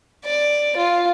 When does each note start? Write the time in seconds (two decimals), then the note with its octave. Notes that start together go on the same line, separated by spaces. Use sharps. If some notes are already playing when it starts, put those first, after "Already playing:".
0.25 D5
0.76 F4